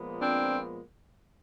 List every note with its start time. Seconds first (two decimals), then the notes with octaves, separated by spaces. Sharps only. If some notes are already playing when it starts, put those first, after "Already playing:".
Already playing: A#2 F3 G#3 B3
0.21 C4 D4